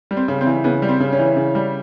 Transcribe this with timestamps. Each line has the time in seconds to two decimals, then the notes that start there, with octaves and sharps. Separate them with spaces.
0.11 G3
0.17 C4
0.28 C#3
0.41 C4
0.46 E3
0.64 C#3 B3
0.82 G3
0.89 C4
1.00 C#3
1.12 C#4
1.19 E3
1.37 C#3
1.55 G3